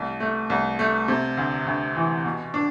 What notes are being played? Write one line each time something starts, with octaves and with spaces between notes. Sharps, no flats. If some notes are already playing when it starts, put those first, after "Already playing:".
Already playing: C2 A3
A3
C2
A3
C3
D2
D2
E3
B2
D4